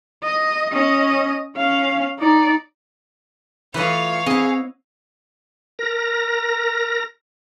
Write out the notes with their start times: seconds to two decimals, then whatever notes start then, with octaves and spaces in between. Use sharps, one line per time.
0.23 D#5
0.72 C#4 D#5
1.57 C#4 F5
2.19 D#4 D5
3.74 E3 A3 F4 B4 C#5 D#5 F5
4.26 C4 E4 G#4 D#5
5.79 A#4 A#6